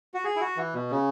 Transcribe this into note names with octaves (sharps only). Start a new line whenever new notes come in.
F#4
G#4
E4
F#4
E3
B2
C#3